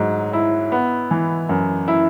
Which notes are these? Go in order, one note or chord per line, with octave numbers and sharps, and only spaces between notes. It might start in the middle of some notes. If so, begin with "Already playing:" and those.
Already playing: G#2 F#3
E4
B3
E3
F#2
E4